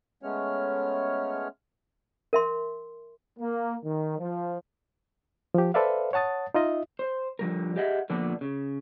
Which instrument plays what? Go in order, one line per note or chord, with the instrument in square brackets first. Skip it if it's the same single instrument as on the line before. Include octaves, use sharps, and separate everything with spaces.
[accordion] G#3 A3 B3 C#4 C#5 F6
[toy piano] A#4 E5 C6
[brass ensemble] A#3
D#3
F3
[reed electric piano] F3 G4
A4 B4 C5 D5 E5 F5
C#5 F#5 A5 D#6 A6
D#4 F4 D#5 E5
[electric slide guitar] C5
D3 F3 G3 A#4
G4 G#4 D#5 E5 F#5
A#2 D3 F3 A#3 B3 D4
C#3